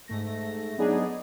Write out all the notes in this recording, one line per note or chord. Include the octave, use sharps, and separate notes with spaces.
G#2 A3 A#6
F#3 B3 D4 D#4 G#4